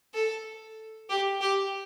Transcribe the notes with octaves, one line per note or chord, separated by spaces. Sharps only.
A4
G4
G4